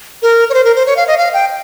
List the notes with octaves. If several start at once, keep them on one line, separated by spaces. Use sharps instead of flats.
A#4
C#5
C5
A#4
C5
C#5
F5
D#5
F5
G5